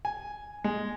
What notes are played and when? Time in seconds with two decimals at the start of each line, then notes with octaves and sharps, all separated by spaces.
0.05 G#5
0.64 G#3